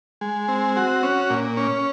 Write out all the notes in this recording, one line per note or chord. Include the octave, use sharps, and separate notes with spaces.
G#3
C4
F#4
C#4
A#2
C#4